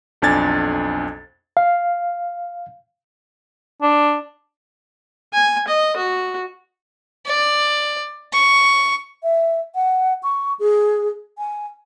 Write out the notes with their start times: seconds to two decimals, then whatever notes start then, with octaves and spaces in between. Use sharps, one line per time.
0.22 B1 F2 D4 G#5 G#6 A6
1.57 F5
3.82 D4
5.34 G#5
5.68 D#5
5.97 F#4
7.26 D5
8.33 C#6
9.23 E5
9.75 F#5
10.23 C#6
10.59 G#4
11.38 G#5